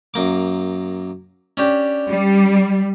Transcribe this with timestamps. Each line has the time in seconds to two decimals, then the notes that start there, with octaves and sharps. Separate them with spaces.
0.14 F#2 A#3 D6
1.57 C#4 D4 G4
2.09 G3